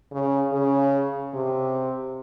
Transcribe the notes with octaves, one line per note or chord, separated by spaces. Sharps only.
C#3
C#3
C3